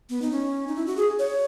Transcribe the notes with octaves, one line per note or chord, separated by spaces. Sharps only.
B3
D#4
C#4
D#4
E4
F#4
G#4
C#5